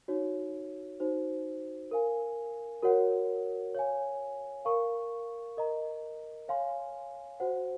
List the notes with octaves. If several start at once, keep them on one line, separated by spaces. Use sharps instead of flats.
D#4 F#4 C#5
D#4 F#4 C5
A#4 F5 G#5
F#4 A#4 C#5 F#5
C#5 F5 G#5
A#4 F5 A#5 C#6
A#4 D#5 A#5
C#5 F5 G#5 C6
F#4 C5 F#5